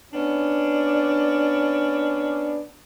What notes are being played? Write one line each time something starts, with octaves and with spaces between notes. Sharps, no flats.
B3 C#4 D4